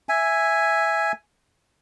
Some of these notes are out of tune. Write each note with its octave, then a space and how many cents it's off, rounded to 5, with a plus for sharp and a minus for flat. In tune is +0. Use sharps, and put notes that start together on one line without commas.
E5 +0 G#5 +0